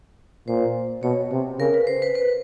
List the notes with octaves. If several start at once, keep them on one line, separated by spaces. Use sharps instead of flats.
A#2 C5
B2 C#5
C3
C#3 A#4
B4
C5
B4
B4